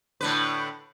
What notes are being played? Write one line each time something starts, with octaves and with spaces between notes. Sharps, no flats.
A2 D3 B4